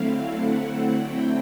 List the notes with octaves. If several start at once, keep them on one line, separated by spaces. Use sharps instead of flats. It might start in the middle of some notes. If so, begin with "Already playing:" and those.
Already playing: D3 F#3 A3 C4 E4 F5
F#5
G5